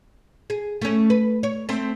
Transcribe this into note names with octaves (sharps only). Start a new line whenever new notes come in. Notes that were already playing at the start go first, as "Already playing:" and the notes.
G#4
A3 C#4
B4
C#5
A3 C4